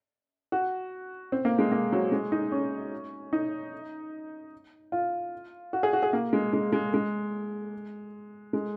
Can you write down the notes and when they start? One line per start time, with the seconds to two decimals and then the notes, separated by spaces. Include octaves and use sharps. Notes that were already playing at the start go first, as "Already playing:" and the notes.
0.52 F#4
1.32 C4
1.45 A#3
1.59 G#3
1.72 A#3
1.92 F#3
2.12 G#3
2.32 D#4
2.52 C#4
3.33 D#4
4.92 F4
5.73 F#4
5.83 G#4
5.93 F#4
6.03 G#4
6.13 A#3
6.33 G#3
6.53 G#3
6.73 G#3
6.94 G#3
8.53 G#3